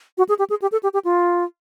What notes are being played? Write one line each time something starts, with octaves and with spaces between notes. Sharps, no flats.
F#4
G#4
G4
G#4
G4
A4
G4
G4
F4